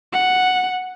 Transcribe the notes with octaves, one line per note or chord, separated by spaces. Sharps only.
F#5